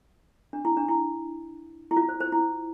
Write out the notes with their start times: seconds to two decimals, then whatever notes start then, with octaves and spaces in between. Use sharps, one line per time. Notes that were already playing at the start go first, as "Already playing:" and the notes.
0.53 D4
0.65 E4
0.77 D4
0.88 E4
1.91 E4
1.97 F4
2.09 C5
2.20 C5
2.32 E4